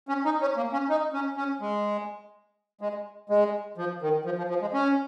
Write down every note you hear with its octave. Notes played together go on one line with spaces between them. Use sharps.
C#4
D#4
C#4
A#3
C#4
D#4
C#4
C#4
G#3
G#3
G#3
F3
D#3
F3
F3
F3
G#3
C#4